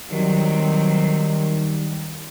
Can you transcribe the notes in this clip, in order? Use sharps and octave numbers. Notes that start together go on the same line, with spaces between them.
D#3 F#3 G3 C4